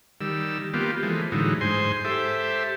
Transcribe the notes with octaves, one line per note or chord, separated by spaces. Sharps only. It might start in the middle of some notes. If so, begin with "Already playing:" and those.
D#3 G3 E6
G3 A#3 B3 F4 G4
E3 F3 G#3 A3
A2 D3 E3 F#3 G#3 D#4
G#2 C5 G#5 C6
G4 A4 C5 E5